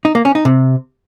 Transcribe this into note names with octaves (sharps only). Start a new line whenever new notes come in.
D#4
A#3
C#4
D#4
C3